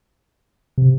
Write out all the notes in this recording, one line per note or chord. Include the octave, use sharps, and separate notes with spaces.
C3